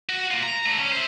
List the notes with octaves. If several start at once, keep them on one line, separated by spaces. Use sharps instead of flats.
F#4
A#3 F4
A#5
D3 A3
C#4
C5 E5